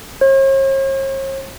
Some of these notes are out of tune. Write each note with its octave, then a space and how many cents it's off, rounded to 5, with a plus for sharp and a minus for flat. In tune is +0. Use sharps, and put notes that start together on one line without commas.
C#5 -45